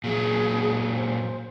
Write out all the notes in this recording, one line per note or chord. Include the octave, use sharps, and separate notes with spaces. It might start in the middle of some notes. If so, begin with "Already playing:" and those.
A#2 F#3 G#4
C5